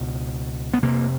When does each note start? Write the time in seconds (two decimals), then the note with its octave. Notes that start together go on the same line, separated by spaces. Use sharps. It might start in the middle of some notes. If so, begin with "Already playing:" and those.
Already playing: C#2 B2
0.74 B3
0.83 F1 F2 C3 A#3